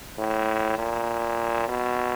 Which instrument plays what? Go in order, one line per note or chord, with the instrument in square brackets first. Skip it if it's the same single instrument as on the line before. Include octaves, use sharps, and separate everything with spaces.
[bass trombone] A2
A#2
B2